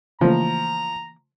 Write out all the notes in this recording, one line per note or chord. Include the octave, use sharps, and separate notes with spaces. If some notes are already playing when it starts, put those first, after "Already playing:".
C#3 E3 F3 A3 A#3 A#5